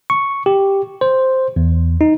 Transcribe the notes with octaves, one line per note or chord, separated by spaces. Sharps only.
C#6
G4
C5
E2
D#4